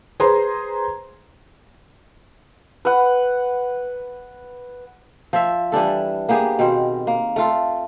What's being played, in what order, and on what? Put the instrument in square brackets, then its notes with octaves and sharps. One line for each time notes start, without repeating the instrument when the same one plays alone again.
[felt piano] G#4 B4 C5 A#5 C6
[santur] B4 F#5
[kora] F3 E5
E3 G3 D4 A4
A#3 B3 G4 G#4
B2 D#3 C4
A#3
A3 F4 A4